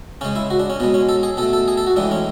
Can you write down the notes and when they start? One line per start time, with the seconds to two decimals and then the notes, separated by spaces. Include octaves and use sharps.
0.21 C#3 G#3 C#4
0.36 E4
0.50 F#4
0.59 D4
0.70 C#4
0.80 B2 G#3 B3
0.94 C#4
1.09 A4
1.23 G#4
1.37 B2 A4
1.42 A3
1.53 A4
1.68 G#4
1.78 A4
1.87 F#4
1.96 A2 E3 G#3 D4
2.11 C#4